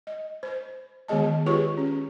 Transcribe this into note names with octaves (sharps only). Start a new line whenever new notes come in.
D#5
C5
D#3 G#3 B3 G#4 D#5 A5
F4 G4 G#4 B4 C#5 C#6
C#4